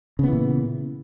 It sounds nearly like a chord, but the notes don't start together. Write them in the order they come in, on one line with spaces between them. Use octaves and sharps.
C#3 B3 E3 A#2